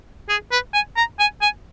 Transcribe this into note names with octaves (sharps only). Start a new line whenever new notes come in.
G#4
B4
G#5
A#5
G#5
G#5